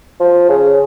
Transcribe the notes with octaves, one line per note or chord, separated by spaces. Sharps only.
F3
C#3